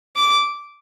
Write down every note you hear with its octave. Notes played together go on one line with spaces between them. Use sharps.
D6